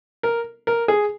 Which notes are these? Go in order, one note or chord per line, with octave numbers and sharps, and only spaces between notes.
A#4
A#4
G#4